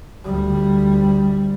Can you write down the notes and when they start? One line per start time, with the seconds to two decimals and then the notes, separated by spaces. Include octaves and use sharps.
0.24 D2 G3